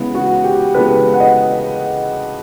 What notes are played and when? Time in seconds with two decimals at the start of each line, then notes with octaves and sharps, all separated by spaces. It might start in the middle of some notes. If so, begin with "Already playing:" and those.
Already playing: C#3 E3 G#3 B3
0.15 F#4
0.44 G4
0.75 C#3 E3 G#3 B3 A4 B4
1.14 F#5
1.20 D#5